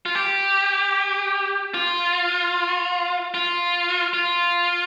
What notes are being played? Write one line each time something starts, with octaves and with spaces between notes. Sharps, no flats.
F4
G4
F4
F4
F4